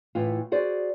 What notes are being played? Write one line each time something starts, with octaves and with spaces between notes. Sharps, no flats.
A2 E3 F4
F#4 G#4 C5 D5